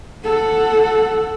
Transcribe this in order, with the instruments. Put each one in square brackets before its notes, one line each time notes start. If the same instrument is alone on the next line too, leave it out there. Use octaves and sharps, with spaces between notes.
[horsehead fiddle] A4 F#5